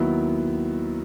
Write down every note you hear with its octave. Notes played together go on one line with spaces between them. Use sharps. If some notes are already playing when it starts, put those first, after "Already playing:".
Already playing: D#2 D#3 F#3 B3 E4